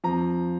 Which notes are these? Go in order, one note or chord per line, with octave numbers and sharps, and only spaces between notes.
F2 F3 A#5